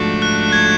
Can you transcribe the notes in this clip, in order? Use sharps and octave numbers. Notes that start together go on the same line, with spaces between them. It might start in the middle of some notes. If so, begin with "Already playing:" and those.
Already playing: G#2 F3 A3 D4 F#4
F#6
G#6